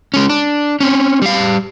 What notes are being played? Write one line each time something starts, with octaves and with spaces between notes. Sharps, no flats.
G#3 C#4
D4
C4 C#4
G3 F5